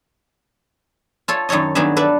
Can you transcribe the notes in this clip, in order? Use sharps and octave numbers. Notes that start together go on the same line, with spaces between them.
F4 A4 C#5
F#2 D#3 A4 C#5 D#5
G2 D#3 F#3 B3 G#4 E5
A4 B4 D5 E5